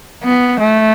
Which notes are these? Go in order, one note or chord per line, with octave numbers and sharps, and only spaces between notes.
B3
A3